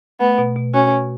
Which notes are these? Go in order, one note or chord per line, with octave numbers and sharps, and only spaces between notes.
A3 B3
B2
B2
C#4 F#4
B2